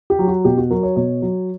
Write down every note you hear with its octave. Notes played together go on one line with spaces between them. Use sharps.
G4
F#3
F#4
B2 G4
F#4
F#3 A#4
C#5
B2 C#5
F#3